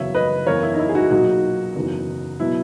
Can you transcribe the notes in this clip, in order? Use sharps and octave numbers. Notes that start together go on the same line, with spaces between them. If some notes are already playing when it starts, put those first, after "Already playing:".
Already playing: F#1 E2 C#3 F#3 C#5 E5
B4 D#5
F#1 E2 C#3 A#4 C#5
E4
D#4
E4
G#4
D#4 F#4
B1 A#2 F#3 D#4 F#4
F#1 E2 D#3 F#3
B2 F#3 E4